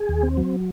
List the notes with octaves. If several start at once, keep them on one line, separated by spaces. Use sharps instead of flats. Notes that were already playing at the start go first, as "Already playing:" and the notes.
Already playing: G#4
D#2
C4
F#3